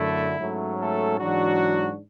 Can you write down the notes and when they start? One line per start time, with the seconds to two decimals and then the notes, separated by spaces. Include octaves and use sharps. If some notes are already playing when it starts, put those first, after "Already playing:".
Already playing: F#2 D3 A3 E4
0.39 G#2 F#3 A3 C#4
0.79 A3 A4
1.20 G#2 E3 F#3 G#3 D4 F#4